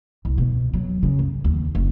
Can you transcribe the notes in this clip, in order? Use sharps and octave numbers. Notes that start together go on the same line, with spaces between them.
C2
B2
F#3
C#3
F#2
D#2
F#1